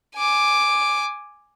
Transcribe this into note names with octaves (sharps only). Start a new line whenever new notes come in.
G#5 D6